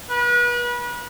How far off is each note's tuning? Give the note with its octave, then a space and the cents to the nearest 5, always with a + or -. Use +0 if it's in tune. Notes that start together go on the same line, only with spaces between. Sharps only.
B4 -35